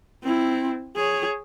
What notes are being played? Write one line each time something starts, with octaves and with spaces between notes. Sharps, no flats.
C4 E4
G#4 C#5